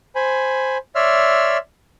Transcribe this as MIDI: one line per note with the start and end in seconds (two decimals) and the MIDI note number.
0.16 0.78 72
0.16 0.78 80
0.16 0.78 83
0.95 1.57 73
0.95 1.57 74
0.95 1.57 76
0.95 1.57 84
0.95 1.57 88
0.95 1.57 89